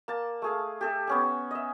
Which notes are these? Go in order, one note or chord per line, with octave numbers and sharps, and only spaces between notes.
A#3 A5
A3 G#4 F5
G4 A4 E5
B3 C#4 G#5
D#5 E5